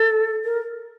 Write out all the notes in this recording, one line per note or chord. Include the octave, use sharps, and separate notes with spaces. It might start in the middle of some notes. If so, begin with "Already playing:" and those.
Already playing: A4
A#4